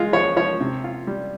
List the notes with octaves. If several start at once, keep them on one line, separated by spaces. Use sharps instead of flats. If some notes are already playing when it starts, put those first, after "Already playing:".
Already playing: G#3 F4
F3 C#5
F3 C#5
C3
F4
G3